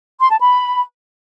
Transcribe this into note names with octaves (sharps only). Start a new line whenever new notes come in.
C6
A5
B5